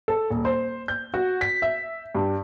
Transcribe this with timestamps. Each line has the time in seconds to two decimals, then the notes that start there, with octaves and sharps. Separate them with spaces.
0.08 A4
0.30 D#1
0.45 C5
0.88 G6
1.14 F#4
1.41 B6
1.62 E5
2.15 G2